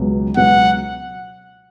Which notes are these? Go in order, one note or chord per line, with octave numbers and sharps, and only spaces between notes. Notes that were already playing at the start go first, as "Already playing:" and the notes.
Already playing: C#2 B2 F#3 B3
C#2 B2 F#3 B3 F#5